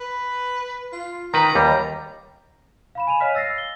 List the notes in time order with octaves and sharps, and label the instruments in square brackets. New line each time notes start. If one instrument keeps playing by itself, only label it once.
[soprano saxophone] B4
F4
[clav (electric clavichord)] D#3 B4 [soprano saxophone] A#5
[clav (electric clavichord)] D#2 G3
[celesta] F5 B5 E7
G#5 D#7 F7
C#5 D#5 F5 F6 B6
E6 A6 A#6 C7
G7